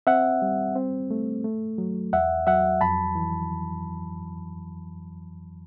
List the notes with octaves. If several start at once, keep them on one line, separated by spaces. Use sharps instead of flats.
C4 E5 F#5
G3
C4
A3
A3
F#3
E2 E5 F#5
F#3 E5 F#5
F2 A5 B5
E3